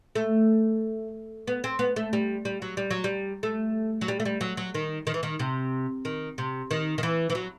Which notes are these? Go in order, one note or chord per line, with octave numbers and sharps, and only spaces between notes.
A3
B3
C4
B3
A3
G3
G3
F#3
G3
F#3
G3
A3
F#3
G3
A3
G3
F#3
F#3
D#3
D#3
E3
D#3
C3
D#3
C3
D#3
D#3
E3
E3
F#3